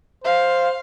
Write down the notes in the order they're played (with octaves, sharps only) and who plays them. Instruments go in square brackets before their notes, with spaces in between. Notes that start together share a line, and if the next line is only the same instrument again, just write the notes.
[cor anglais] C5 [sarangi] F5